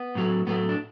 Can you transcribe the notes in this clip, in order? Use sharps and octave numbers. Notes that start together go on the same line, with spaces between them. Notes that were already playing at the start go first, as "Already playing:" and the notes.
Already playing: B3
A2 F#3 A3
A2 F#3 A3 B3
D4